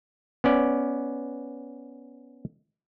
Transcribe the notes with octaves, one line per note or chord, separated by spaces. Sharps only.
B3 C#4 D5